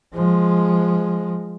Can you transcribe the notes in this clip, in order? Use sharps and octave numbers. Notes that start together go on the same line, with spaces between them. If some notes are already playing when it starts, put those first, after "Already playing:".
F3 G#3